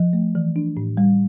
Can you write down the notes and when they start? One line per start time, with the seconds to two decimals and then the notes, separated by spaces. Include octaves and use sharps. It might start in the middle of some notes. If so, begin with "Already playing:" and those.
Already playing: F3
0.13 A3
0.35 E3
0.56 D4
0.77 A2
0.97 G3